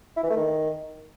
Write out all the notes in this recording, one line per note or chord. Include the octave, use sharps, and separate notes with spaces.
E4
E3
A3
D#3